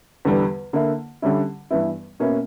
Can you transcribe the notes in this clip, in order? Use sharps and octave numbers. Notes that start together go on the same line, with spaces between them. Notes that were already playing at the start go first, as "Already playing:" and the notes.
E2 D3 G3 B3
D3 A#3 E4
D3 G3 C#4 E4
G2 E3 B3 E4
B2 A#3 C#4 E4